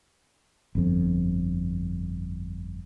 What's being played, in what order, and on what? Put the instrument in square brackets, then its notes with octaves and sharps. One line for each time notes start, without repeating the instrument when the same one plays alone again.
[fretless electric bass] G1 F2